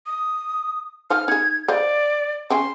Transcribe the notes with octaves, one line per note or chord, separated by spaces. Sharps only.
D#6
D#4 F4 C5 F6
D#4 G#4 G#6
C5 D5 D#5 F5
C#3 C#4 G5 C6